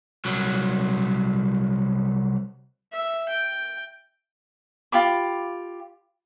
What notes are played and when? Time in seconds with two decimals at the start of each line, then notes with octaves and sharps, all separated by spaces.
0.25 C2 F#3
2.92 E5
3.28 G5
4.92 F4 G4 B5 D6